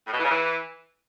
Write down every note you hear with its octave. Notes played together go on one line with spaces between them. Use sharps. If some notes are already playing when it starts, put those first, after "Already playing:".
A2
B2
E3
C#3
E3